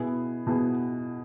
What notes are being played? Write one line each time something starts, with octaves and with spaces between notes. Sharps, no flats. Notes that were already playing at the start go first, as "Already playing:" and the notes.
Already playing: B2 B3 E4 G#4
B2 B3 E4 G#4